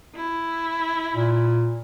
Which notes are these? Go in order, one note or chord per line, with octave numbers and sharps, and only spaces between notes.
E4
A#2